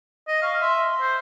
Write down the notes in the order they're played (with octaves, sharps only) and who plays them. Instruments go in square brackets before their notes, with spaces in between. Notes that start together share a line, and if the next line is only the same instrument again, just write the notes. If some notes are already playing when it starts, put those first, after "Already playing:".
[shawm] D#5
[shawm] F5 [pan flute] C#6
[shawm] E5 [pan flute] C6
[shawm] C5